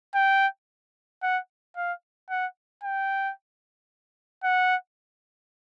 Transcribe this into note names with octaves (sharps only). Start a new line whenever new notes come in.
G5
F#5
F5
F#5
G5
F#5